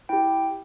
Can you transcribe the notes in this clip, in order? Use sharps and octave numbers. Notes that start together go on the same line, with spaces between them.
E4 G4 G5